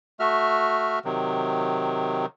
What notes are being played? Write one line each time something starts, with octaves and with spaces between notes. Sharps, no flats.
A3 F#4 E5 F6
C3 D#3 F#3